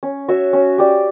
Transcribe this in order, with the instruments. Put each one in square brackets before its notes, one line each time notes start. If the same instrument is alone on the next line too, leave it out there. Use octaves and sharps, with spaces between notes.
[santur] C#4
F#4 C#5 E5
C#4
G4 D5